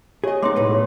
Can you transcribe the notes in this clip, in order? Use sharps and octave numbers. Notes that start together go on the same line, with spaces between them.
G4 G#4 C#5 D#5
G#3 B3 D#4 C#5 C6 D6
B1 A2 B4
G#4 C#5